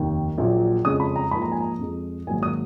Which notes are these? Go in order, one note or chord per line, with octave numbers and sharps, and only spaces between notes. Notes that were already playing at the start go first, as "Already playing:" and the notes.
Already playing: F1 D#2 D#3
A#1 A#2 F#3
F2 C#3 G#3 C#4 D#6
B5
A#5
G#2 F3 A#3 D#4 B5
A#5
G#5
A#5
F2 F3 G#3
G#1 G#2 F#3 A#3 G#5
D#6